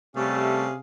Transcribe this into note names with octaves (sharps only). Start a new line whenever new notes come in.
C3 G3 A3 C#4 G#4 F5